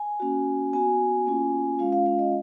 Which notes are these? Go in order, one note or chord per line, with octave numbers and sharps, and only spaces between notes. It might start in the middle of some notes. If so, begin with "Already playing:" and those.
Already playing: G#5
A#3 C#4 F#4
B3 F#4 G#5
A#3 C#4 F4
G#3 C#4 F4 F5
F5
F5
D#5